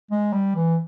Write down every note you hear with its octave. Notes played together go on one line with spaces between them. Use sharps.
G#3
G3
E3